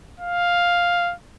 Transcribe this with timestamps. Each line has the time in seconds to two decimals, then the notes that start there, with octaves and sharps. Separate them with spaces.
0.20 F5